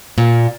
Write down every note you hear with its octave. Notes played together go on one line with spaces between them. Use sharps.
A#2